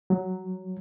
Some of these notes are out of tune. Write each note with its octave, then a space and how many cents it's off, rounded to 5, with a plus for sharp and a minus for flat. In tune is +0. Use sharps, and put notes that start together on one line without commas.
F#3 +5